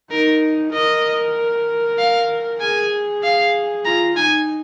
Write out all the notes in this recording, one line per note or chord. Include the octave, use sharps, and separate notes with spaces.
D#4 A#4
A#4 D#5
F5
G#4 G#5
F5
F4 A#5
D#4 G#5